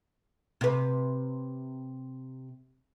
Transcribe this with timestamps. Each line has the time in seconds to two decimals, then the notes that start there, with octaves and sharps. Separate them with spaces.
0.61 C3 B4